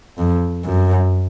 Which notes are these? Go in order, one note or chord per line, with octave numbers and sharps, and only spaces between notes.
F2
F#2